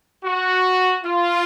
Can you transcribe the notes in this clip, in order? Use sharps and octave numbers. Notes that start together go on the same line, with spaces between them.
F#4
F4